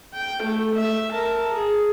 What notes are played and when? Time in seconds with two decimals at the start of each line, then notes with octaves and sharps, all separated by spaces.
0.14 G5
0.43 A3
0.76 E5
1.12 A#4 A5
1.53 G#4